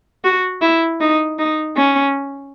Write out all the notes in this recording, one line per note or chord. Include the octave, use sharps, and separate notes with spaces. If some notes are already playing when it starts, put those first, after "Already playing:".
F#4
E4
D#4
D#4
C#4